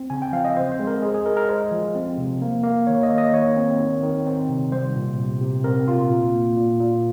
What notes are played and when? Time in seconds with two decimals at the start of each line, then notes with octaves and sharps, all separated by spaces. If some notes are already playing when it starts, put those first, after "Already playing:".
Already playing: C4
0.10 C#3 G#5
0.22 G5
0.32 F3 F5
0.45 D#5
0.56 C4 C5
0.72 C5
0.79 G#3
0.87 A#4
1.02 G#3 G#4
1.14 G#4
1.25 G#3 A#4
1.37 A#4
1.49 G#3 C5
1.72 F3
1.95 C4
2.18 C3
2.42 A#3
2.64 A#3
2.87 D#3 C#5
3.03 D#5
3.10 A#3
3.18 D#5
3.33 D#3 C#5
3.57 C4
3.80 D#3
4.03 D#3
4.26 C4
4.49 C3
4.72 G3 C5
4.95 A#2
5.18 C3
5.41 C3
5.64 C4 A#4
5.88 A#2 F4
6.10 A#2
6.34 A#3
6.57 A#2
6.79 A#2